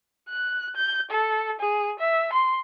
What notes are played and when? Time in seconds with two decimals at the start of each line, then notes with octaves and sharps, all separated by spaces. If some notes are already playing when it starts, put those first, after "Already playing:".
0.29 F#6
0.76 G6
1.11 A4
1.60 G#4
1.99 E5
2.33 C6